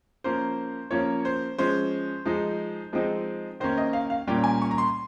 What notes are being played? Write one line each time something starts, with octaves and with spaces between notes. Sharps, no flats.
F3 A#3 C#4 C5
F3 A#3 C#4 C#5
C5
F3 G#3 C#4 C5
F3 G#3 D#4
F3 G#3 C4 D#4
D#3 A#3 C#4 C5
D#5
F5
F5
A#2 G3 A#3 C#4 G5
G#5
C#6
A#5
C6